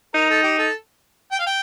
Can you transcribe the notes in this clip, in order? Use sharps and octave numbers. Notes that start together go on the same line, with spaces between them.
D#4 A#4
A4
G4
A4
G5
F5
G5